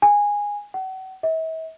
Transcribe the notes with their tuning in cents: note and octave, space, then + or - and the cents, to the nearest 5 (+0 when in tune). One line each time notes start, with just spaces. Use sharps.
G#5 -15
F#5 +35
E5 -45